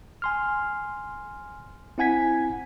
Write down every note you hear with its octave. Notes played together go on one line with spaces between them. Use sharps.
G#5 C6 F6
C4 E4 F#5 G#5 G#6 B6